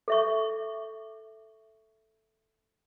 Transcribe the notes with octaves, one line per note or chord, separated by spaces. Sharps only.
A4 E5 C#6